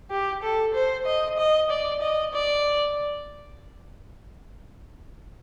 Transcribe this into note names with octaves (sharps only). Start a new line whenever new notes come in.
G4
A4
C5
D#5
D#5
D5
D#5
D5